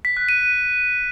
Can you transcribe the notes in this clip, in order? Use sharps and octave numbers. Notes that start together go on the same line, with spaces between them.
B6
F#6
D#7